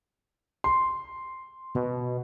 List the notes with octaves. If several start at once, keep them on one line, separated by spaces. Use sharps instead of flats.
C6
B2